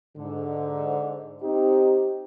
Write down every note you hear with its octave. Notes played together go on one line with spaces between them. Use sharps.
G#2 D3
C4 D#4 G4